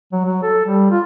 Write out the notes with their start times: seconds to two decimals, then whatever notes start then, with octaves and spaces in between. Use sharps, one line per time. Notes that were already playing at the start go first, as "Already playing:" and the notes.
0.12 F#3
0.25 F#3
0.43 A4
0.65 G3
0.91 F4